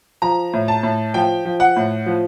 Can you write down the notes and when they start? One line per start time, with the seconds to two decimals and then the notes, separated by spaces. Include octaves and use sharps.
0.22 F3 A#5
0.53 A2
0.68 A5
0.83 A2
1.14 F3 G5
1.45 F3
1.60 F#5
1.76 A2
2.06 F3